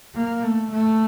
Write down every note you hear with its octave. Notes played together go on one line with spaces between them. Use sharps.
A#3
A3
A3